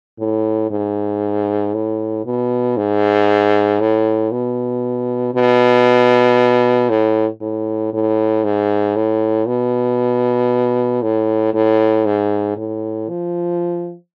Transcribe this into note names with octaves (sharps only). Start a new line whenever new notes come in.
A2
G#2
A2
B2
G#2
A2
B2
B2
A2
A2
A2
G#2
A2
B2
A2
A2
G#2
A2
F3